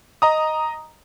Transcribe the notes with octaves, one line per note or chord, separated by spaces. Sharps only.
D#5 A#5 D#6